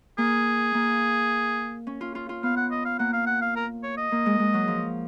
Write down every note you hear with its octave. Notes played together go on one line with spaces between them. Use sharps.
A#3 G#4
A#3
C#4
F4
F4
F4
B3 F5
F#5
D#5
F5
A#3 F#5
F5
F#5
F5
A#4
C#5
D#5
A#3
G#3
G#3
F#3
F3